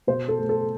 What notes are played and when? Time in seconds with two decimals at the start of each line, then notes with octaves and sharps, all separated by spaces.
0.07 B2 C5
0.29 A4
0.39 A3
0.49 A4